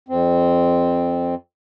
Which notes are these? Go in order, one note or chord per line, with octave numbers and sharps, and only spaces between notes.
F2 C4